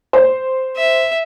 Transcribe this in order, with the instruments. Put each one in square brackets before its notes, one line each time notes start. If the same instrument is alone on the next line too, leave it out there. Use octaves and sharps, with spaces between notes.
[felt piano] C5
[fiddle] E5